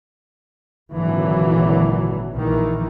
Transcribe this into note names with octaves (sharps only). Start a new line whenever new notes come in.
G#1 A#2 D3 E3 F#3
A#1 D#3 E3